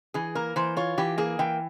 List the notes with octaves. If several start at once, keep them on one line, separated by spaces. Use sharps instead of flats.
E3 G#4
A#3 A#4
E3 C5
F4 C#5
E3 G4
A#3 G#4
E3 G5